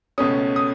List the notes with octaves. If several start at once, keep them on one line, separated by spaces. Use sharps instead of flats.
C#2 B2 A3 C#4 D#6
D#6